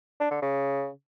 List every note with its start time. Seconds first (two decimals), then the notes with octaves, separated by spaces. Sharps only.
0.20 D4
0.31 D3
0.42 C#3